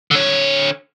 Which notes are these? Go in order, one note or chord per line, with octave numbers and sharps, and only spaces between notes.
D3 C#5